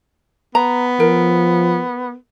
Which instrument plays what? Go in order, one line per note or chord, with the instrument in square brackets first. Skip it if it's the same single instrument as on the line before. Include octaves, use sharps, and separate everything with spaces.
[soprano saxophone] B3 [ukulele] A#5
[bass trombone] F3 [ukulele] A#4